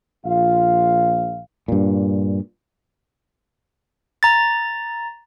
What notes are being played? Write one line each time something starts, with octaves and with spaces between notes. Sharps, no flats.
A#1 F4 F5
G2 A#2
A#5 A6